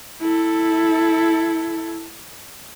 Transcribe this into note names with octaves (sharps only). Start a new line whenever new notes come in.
E4 A4